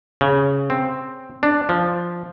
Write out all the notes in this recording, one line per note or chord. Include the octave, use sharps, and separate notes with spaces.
C#3
C4
D4
F3